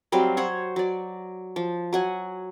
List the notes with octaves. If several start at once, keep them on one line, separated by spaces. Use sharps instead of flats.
F#3 G3 C4 F5
C5 C#5 F#5
F#3 D5
F3
F#3 F#5 G#5